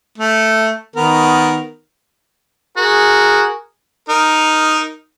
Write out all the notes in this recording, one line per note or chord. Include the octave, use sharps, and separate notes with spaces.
A3
D#3 B3 A#4
F#4 G#4 A#4
D#4 A#4